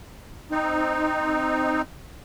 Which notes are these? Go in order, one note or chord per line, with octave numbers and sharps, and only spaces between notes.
C4 D#4